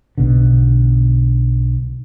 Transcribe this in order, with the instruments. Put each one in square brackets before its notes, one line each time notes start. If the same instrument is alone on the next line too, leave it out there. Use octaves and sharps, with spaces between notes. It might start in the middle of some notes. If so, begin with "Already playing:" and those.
[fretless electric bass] B1 B2 D3